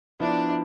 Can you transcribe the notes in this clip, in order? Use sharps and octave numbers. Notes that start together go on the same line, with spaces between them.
F3 B3 D4 E4
E4